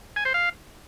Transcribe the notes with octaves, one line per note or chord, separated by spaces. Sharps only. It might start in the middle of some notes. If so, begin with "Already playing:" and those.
G#5
C5
F5